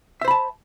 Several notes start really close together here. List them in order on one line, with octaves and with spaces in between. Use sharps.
E5 C5 B5 A5